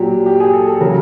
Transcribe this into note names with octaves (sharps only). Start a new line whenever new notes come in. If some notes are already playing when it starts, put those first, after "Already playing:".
Already playing: A#2 F#3 G4
G4
G#4
A4
A4
C#3 F#3 A#4